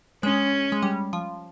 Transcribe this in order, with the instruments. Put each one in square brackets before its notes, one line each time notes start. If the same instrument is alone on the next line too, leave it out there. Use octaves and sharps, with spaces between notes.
[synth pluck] G#3 [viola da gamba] C#4
[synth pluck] G#3
G3
F3